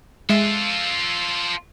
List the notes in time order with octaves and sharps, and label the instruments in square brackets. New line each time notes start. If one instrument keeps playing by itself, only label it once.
[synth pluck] G#3 E5 D7 [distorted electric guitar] F4 A4